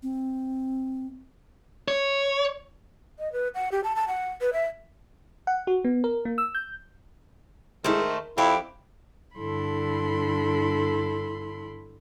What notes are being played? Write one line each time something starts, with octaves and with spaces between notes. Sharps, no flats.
C4
C#5
D#5
B4
F#5
G4
A5
A5
F#5
B4
E5
F#5
F#4
B3
A#4
A#3
E6
G6
D#3 G#3 A3 E4 G#4 C5
A#4
F2 E4 G4
G2 D3 E4 A4 B5 C6